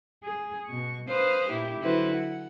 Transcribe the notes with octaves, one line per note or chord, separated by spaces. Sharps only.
G#4
B2 C#6
B4 C5 F5 D#6 F6
A#2 A#3 E4 G4
D3 F#3 E4 F#4 B4 C5
F#5